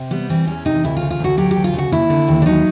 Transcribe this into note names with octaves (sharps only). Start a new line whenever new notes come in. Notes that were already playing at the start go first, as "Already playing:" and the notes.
Already playing: C3
G3 B3
E3 C4
E2 C#4
C3 D#4
D2 E4
C#3 F4
F4
D2 F#4
F#3 G4
G4
D2
F4
C#3
F#4
D#2 E4
D3
D#2
D4
F#3 D#4